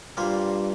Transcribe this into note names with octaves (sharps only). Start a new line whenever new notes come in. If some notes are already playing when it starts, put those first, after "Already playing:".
G2 A#2 G3 A#3 F4 C5